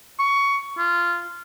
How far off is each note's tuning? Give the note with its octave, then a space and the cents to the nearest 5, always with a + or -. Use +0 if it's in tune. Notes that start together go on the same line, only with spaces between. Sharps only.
C#6 +15
F4 -15